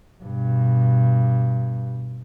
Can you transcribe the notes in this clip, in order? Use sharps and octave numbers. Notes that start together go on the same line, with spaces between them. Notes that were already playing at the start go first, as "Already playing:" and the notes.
G2 B2